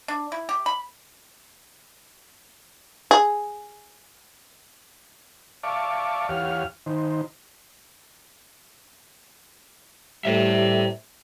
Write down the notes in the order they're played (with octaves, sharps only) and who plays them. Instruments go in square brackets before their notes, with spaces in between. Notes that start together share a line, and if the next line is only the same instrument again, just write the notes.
[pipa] D4
E4
G4
B5
[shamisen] G#4
[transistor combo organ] D5 E5 F5 A5 C#6 D6
E2 G4 C#5 F5 F#5 F6
D#3 D#4 C5
[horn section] A2 G3 A3 [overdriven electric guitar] C5 E5